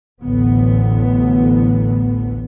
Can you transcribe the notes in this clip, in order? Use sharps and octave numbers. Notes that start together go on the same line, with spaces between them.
A1 D2 A2 B3